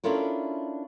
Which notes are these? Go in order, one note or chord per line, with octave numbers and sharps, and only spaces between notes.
C#4 D4 E4 F4 A4 A#4